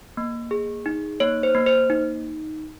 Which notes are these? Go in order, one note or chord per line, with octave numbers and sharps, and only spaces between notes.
A#3
G#4
D#4
A#3 C#5
C5
A#3
C5
D#4